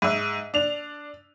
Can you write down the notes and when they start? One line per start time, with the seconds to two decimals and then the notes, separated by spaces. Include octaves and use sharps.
0.02 G#2 E5
0.54 D4 F7